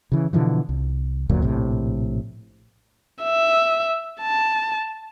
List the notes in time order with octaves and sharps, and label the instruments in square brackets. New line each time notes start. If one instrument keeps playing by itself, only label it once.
[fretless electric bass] C#3 E3
B2 D3 E3 F3
C2
F#1 D2 A#2 F#3
A#1 A2 C3
[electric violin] E5
A5